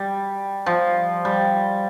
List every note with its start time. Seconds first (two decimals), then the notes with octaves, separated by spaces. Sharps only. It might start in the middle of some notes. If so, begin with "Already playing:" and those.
Already playing: G3
0.66 F3
1.25 G3